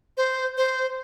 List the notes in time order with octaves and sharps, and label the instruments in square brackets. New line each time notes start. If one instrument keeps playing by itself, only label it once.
[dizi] C5
C5